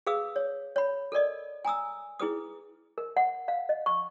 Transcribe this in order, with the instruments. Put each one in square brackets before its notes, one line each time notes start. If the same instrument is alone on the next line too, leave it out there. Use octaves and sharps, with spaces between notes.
[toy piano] G#4 B4 F5 D#6 E6
C#5
C#5 B5
A4 A#4 D5 D#5
G#5 A#5 D#6 E6
E4 G#4 B4 D#6
A#4
F#5
F5
D#5
C#6